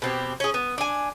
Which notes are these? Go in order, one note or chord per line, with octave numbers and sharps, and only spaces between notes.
B2 C4 G4
C#4 G#4
B3
D4 G#5